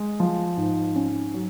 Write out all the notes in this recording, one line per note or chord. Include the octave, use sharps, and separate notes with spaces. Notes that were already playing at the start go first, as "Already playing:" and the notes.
Already playing: G#3
F3
G#2
C#4
F#3